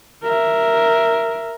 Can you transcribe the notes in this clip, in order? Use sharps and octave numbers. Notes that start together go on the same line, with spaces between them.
A#4 E5